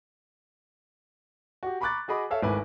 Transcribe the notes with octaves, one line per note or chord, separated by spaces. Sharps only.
F#4 G4
A#5 B5 C#6 D6 F#6 A6
F#4 G#4 D#5 B5 D6
A4 C#5 E5 F5
G#1 A3 E4 B4 G#5 D6